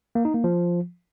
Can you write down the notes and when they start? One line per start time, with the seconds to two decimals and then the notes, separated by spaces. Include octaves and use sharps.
0.15 A#3
0.25 D#4
0.34 A#3
0.44 F3